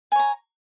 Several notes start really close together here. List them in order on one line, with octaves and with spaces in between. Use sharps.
G#5 C#5 A#5